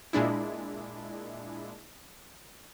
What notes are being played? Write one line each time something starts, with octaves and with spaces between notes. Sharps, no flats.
A#2 G#3 D4 E4